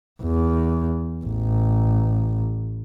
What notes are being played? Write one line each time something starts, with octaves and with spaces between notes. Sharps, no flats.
E2
A1